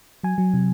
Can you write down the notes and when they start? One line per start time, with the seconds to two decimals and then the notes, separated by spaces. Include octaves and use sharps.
0.23 F#3 G#5
0.38 F#3
0.54 C3